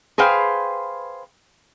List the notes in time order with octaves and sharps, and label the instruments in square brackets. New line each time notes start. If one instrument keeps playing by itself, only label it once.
[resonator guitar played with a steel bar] G#4 B4 C5 F5 G5